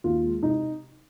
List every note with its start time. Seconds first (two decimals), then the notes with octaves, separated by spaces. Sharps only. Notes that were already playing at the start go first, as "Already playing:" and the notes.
0.04 D#2 F4
0.24 G#3
0.43 C3 D#4